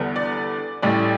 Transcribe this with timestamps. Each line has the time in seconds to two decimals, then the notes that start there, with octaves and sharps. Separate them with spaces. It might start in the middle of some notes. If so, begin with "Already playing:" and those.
Already playing: E2 D3 G3 B3
0.16 D5
0.82 A1 A2 G3 D5